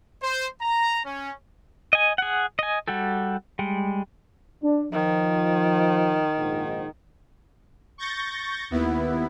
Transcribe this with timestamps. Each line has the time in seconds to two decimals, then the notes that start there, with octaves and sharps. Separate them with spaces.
0.22 C5
0.62 A#5
1.06 C#4
1.93 D#5 G#5
2.18 G#4 F#5
2.59 D#5 G#5
2.88 G3 F#4 G4 A4
3.59 G3 G#3
4.64 D4
4.92 D#3 F3
6.37 A#1 G#2
7.98 C#6 G6 A6 A#6
8.70 D#2 B3 E4